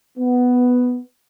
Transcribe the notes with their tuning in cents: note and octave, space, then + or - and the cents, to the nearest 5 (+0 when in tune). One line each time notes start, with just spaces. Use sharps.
B3 +5